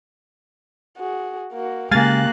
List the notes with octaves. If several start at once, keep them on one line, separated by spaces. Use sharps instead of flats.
F#4 G#4
A#3 F#4
C#3 G#3 A#3 G4 F5 G#5 F#6 A6